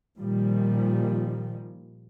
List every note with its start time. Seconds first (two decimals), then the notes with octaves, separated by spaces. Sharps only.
0.18 A#2 D#3 F3 G3